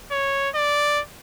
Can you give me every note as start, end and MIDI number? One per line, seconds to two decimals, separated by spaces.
0.11 0.49 73
0.55 1.01 74